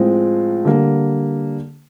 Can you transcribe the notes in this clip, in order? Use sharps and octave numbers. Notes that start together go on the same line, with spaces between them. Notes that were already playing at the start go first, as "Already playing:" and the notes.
Already playing: A2 F3 G#3 C4 F4
D3 G3 A#3